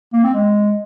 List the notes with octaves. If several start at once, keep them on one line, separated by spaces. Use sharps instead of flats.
A#3
C4
G#3